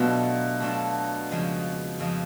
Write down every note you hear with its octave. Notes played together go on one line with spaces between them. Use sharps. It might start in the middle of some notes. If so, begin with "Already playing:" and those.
Already playing: B2 F#3 A3 D4 F4 A4
F#3 A3 D4 F4 A4
F2 C#3 F3 G#3
F2 C#3 F3 G#3